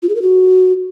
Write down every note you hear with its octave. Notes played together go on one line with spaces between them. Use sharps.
F4
G#4
A#4
F#4